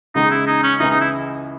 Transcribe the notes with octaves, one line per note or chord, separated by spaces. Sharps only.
E2 C#3 G#3 D#4
E4
D#4
C#4
C#2 C#3 E3 D#4
D#4
E4